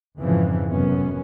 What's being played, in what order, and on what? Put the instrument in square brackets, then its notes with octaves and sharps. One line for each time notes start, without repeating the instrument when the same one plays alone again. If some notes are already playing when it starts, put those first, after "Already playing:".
[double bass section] F2 G#2 C#3 E3 F3
F1 F#2 B3 C#4